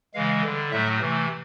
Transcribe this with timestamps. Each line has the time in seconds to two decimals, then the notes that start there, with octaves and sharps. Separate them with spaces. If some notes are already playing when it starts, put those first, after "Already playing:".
0.14 C#3 E3 G#3 F5
0.43 D3 G3
0.71 A2 F#3 A3 E5
1.00 C3 E3 A3